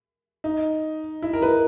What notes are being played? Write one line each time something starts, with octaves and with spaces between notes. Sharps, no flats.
D#4
E4
A#4
B4